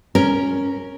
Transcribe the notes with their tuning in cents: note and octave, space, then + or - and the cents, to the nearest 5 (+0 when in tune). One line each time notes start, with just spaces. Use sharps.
C#4 +0 A#4 +0